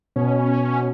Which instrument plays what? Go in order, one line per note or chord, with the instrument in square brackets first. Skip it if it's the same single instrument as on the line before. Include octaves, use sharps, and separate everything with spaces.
[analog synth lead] B2 [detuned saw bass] C#4